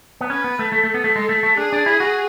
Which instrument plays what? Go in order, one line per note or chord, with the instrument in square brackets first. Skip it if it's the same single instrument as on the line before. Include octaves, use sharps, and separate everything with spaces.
[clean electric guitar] B3
[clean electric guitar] C#4 [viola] B4
[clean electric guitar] B3
A3
[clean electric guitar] A3 [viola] A4
[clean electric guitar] A3
B3
A3
G#3
A3
A3
[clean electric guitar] D4 [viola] G#4
[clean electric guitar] D4
E4
F#4